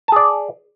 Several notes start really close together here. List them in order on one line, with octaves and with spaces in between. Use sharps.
A5 G#4 D5